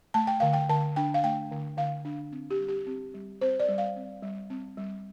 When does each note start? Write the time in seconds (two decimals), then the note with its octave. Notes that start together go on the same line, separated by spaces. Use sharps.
0.14 A3 A5
0.27 G5
0.40 D3 F5
0.53 G5
0.69 D3 A5
0.96 D4 G5
1.14 F5
1.24 A3 G5
1.51 D3
1.77 D3 F5
2.05 D4
2.32 C4
2.51 G4
2.59 G3
2.68 G4
2.86 C4
3.14 G3
3.41 C4 C5
3.60 D5
3.69 G3
3.78 F5
3.96 C4
4.23 G3
4.50 C4
4.77 G3